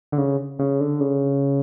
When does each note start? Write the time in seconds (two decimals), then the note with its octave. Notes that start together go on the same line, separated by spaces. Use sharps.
0.12 D3
0.18 C#3
0.59 C#3
0.81 D3
1.00 C#3